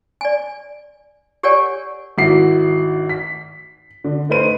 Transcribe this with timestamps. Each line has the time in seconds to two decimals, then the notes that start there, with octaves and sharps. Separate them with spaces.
0.21 D5 G#5
1.43 G4 A#4 C#5 D5 F#5 G#5
2.18 G#1 E4 F#4 F#5 C7
3.09 B6
4.04 D3
4.29 A3 D#4 B4 C5 D#7